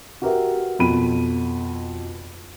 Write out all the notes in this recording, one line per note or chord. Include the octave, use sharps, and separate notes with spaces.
F#4 G4 A#4 B4 E5
F2 B2 B5 D#7